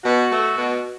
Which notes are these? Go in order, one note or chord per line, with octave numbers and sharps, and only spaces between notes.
B2 F#4
A3
B2